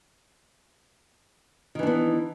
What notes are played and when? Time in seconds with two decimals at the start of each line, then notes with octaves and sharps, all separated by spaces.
1.75 D#3
1.79 E3
1.83 D4
1.87 B3